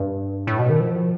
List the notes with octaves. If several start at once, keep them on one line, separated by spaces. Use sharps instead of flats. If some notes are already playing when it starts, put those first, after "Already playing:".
Already playing: G2
A2
B2
D#3
F3